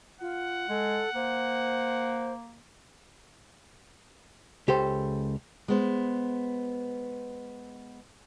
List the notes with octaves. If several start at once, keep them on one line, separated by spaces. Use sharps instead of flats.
F4 F#5
G#3 A4
A#3 C5
C#2 G4 A4 C5
G#3 B3 C5